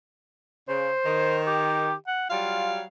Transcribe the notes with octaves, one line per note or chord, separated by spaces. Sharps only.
C#3 C5
D#3
G4
F#5
F#3 G3 F4 F5